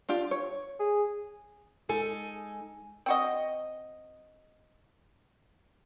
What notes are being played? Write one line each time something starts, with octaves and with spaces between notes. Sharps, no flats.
D4 F4 G4
C#5
G#4
G#3 D#4 A4 G#5
C4 F#4 D#5